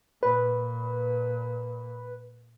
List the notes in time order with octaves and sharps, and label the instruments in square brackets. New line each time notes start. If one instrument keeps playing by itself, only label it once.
[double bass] A#2 [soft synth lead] B4